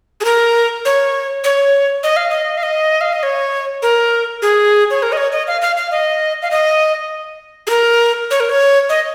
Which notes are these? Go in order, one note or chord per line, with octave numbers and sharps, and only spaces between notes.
G#4
A#4
C#5
C#5
D#5
F5
D#5
F5
D#5
F5
D#5
C#5
A#4
G#4
C#5
A#4
D#5
C#5
D#5
F5
F5
F5
D#5
F5
D#5
G#4
A#4
C#5
A#4
C#5
D#5